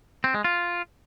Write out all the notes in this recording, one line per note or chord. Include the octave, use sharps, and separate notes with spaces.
C4
G#3
F4